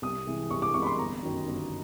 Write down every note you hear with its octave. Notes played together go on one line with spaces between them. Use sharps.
C2 D#6
C3 E3 G#3
C2 C#6
D6
C3 E3 G#3 C#6
B5
C6
G1 A#5
F#2 D#3
G1